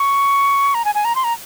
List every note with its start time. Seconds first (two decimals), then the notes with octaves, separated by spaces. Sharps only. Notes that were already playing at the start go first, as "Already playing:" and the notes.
Already playing: C#6
0.74 A#5
0.85 G#5
0.95 G#5
1.05 A#5
1.15 C6
1.24 A#5